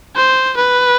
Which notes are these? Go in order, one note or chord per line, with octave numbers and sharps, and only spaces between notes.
C5
B4